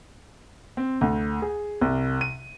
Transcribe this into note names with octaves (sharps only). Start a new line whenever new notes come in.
C4
D2
G#4
C2
D#7